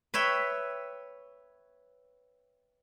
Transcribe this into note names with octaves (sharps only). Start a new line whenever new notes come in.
B4 C#5 E5 G5